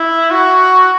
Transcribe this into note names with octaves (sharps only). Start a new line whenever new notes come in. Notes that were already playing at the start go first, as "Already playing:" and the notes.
Already playing: E4
F#4